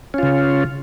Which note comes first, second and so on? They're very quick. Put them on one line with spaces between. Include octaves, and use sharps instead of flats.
C#4 F4 C#3